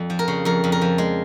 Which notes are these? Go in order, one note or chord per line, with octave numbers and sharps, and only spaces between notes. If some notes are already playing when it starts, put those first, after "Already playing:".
Already playing: F2
F3
A#4
C#3
F2 A#4
F2
A#4
F3
G#3